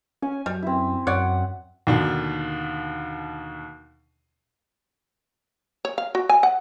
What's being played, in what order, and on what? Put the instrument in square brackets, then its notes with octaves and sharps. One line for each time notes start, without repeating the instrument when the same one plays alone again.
[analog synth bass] C#4 [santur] G#5
[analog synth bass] F#2 [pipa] G3
[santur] C4 E4
[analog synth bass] F#2 [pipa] C#5 D5 [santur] F#5
[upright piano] D#2 B2 D3 D4
[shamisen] C#5
F5
F#4
G#5
F#5